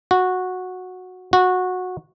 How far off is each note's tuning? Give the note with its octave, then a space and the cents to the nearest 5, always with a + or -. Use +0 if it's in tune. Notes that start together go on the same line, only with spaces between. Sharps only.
F#4 -10
F#4 -15